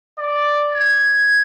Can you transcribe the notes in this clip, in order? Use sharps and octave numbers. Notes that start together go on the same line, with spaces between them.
D5
G#6